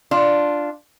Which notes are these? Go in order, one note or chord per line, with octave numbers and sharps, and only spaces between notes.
D4 F4